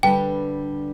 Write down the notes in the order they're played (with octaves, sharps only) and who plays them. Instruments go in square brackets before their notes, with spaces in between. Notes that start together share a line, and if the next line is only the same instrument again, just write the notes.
[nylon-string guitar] D3 G3 D4 G4 B4 [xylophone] G5